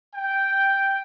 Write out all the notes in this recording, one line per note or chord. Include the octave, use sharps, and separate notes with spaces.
G5